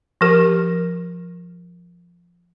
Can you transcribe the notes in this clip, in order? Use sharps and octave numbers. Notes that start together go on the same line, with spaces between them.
F3 G4 A#4